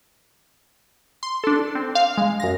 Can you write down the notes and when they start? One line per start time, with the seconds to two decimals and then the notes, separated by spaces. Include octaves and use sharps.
1.23 C6
1.44 D4 A4
1.75 C4
1.95 F5
2.17 G#3
2.40 F#2 A#6